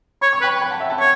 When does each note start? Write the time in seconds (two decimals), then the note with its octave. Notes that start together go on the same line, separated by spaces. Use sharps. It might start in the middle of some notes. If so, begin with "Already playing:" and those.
0.21 C#5 B5
0.33 C#6
0.41 B4 G5 B5
0.61 G5 B5
0.71 F#5 A5
0.80 E5 G5
0.90 F#5 A5
1.00 C#5